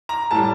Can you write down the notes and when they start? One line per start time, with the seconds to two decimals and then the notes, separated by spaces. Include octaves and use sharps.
0.09 A#5
0.31 A2 G3 A5